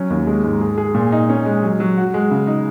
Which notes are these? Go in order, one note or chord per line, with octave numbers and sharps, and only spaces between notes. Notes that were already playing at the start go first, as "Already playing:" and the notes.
Already playing: F#3 C#4
D#2
G#3
G#2
G#4
G#4
A#2
D#4
C#4
G#3
F#3
F#3
F#4
G#3
C#3
D#4